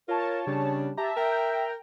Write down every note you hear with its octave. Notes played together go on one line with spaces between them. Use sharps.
F4 A#4 C#5 A5
C#3 G3 D4
G4 E5 A5 A#5
A#4 E5 G5 A#5